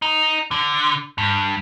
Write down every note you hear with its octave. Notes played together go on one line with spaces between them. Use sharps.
D#4
D3
G2